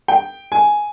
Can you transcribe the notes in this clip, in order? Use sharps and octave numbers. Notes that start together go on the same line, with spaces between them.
G5
G#5